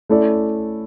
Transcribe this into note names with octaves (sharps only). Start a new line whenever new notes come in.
A3 C#4 E4 A4 D5